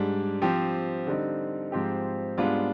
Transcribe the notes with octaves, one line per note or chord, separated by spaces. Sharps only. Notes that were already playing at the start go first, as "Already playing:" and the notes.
Already playing: G#2 G3 D4
F3 C4 G4
D3 G3 C4 D#4
G#2 F3 C4 G4
G#2 G3 B3 D4 F4